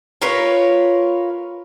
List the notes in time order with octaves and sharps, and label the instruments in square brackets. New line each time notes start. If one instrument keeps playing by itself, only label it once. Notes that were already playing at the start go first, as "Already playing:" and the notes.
[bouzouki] F4 A#4 B4 C#5